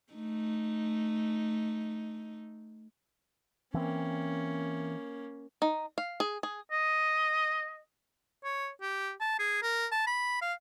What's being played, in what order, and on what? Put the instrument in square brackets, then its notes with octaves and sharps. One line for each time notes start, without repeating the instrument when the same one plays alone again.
[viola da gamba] A3 D#4
[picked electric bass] E3 C4 [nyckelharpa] A#3 C#4
[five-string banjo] D#4
F5
G#4
G#4
[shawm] D#5
C#5
G4
A5
G#4
A#4
A5
B5
F5